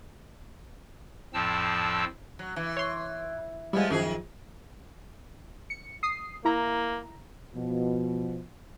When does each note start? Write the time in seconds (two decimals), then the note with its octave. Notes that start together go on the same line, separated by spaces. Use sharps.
1.34 F2 A2 F3 C4 A5 E6
2.39 F#3
2.56 E3
2.77 C#5 C6
3.73 F3 G3 G#3 B3 E4
3.90 F#2 D#3 F3 G#4
5.70 C#7
6.03 D#6 C7
6.45 A#3 E4 A#5
7.54 B2 F3